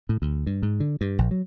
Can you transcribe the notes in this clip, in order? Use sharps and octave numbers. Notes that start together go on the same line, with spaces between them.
A2
D2
G2
G#2
D3
G2
A#1
F#3